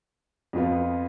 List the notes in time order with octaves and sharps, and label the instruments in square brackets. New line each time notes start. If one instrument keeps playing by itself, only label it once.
[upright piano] F2 F3 B3 F4